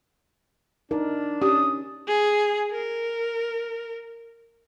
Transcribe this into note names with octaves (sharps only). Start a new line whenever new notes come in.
D4 D#4 A#4
C#4 G4 D#6
G#4
A#4